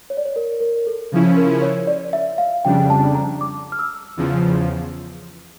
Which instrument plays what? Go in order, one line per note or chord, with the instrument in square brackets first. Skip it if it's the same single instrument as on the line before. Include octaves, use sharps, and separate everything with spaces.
[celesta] C#5
D5
C#5
A#4
A#4
A4
[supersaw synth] C#3 F3 C#4 E4
[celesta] A#4
C#5
D5
E5
F5
[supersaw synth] F2 C#3 G3 D4 [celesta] G5
[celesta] A5
A#5
D6
F6
E6
[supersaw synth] E2 C#3 F3